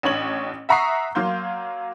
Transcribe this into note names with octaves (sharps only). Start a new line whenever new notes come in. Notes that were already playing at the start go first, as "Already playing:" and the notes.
A1 D4 C#5 F#7
E5 F#5 A#5 C#6 D#6 C7
F#3 A#3 F5 C6 G6